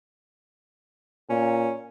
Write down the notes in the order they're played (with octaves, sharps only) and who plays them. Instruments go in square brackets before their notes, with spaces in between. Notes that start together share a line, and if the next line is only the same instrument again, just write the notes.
[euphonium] A#2 [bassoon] C#4